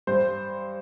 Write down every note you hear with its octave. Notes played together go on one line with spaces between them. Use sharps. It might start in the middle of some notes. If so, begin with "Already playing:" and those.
G2 C5